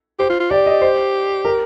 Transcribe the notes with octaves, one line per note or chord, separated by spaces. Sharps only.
G4 C5
F4
F4
G4 D5
D#5
C5
A#4